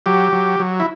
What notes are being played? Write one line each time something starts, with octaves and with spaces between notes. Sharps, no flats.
F#3 G4
F#3
F#3
E4